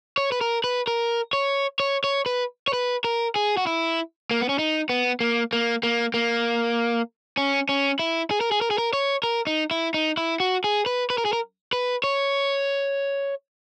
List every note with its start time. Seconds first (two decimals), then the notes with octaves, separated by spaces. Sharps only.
0.18 C#5
0.32 B4
0.41 A#4
0.64 B4
0.87 A#4
1.33 C#5
1.80 C#5
2.04 C#5
2.26 B4
2.68 C#5
2.73 B4
3.04 A#4
3.36 G#4
3.57 F#4
3.67 E4
4.31 A#3
4.41 B3
4.49 C#4
4.59 D#4
4.89 B3
5.20 A#3
5.53 A#3
5.83 A#3
6.14 A#3
7.37 C#4
7.69 C#4
7.99 E4
8.31 G#4
8.41 A#4
8.52 G#4
8.61 A#4
8.71 G#4
8.78 A#4
8.93 C#5
9.23 A#4
9.47 D#4
9.71 E4
9.94 D#4
10.17 E4
10.40 F#4
10.64 G#4
10.86 B4
11.10 B4
11.18 A#4
11.25 G#4
11.33 A#4
11.73 B4
12.04 C#5